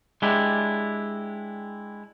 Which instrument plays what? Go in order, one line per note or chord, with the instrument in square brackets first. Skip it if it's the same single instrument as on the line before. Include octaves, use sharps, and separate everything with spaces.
[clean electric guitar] G#3 D4 E4 G4